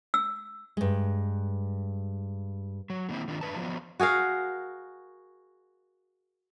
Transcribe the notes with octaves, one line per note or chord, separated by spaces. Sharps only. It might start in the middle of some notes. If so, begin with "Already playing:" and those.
E6
G2 G#3
F#3
D3 D#3 A#3 C4 E4
D#3 D4 F4
A3 D4 B4 A5
F3 F#3 B3 E4 F4
F#4 G#4 A#4 F5